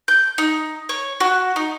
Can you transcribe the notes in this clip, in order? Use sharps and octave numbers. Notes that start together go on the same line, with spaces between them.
G6
D#4
C#5
F#4
D#4